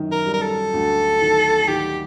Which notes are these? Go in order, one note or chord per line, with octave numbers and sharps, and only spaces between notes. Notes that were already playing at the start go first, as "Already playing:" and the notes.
Already playing: F#2 D#3
A#4
G3
A#4
A4
D2
D#3
D#3 G4